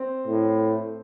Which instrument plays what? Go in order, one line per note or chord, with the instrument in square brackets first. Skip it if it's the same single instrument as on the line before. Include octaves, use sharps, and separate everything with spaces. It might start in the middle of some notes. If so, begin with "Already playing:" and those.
Already playing: [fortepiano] C4
[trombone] A2